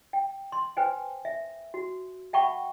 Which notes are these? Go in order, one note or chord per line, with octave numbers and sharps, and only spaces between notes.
G5
C6
B4 C5 G5 G#5
E5
F#4
E5 F#5 G5 A5 B5 C#6